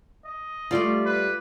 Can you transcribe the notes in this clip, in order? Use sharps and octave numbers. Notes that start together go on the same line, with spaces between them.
D#5
G3 A3 F4 D5
B4